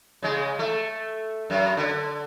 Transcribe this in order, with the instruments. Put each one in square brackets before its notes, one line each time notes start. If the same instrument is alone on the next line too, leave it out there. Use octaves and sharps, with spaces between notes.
[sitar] C#3 G#3
A3
F#2
D3